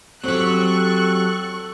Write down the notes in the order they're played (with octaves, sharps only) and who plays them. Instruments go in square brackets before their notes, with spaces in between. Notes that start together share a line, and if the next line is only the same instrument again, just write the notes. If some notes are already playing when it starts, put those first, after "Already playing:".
[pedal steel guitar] F#3 [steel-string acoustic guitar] C4 G4 [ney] A4 [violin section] C#6 F#6